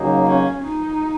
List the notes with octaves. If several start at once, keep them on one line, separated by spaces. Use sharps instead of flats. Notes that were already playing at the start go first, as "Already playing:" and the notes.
Already playing: C#3 F#3 A#3 D#4
C#4
D#4